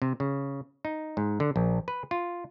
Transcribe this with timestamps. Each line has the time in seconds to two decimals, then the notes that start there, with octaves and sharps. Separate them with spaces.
0.02 C3
0.20 C#3
0.85 D#4
1.17 G#2
1.40 D3
1.56 A#1
1.88 B4
2.11 F4